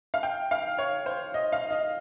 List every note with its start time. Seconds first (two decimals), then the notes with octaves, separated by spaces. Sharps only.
0.14 F5
0.23 G5
0.51 F5
0.78 C#5
1.06 C5
1.34 D#5
1.52 F5
1.71 D#5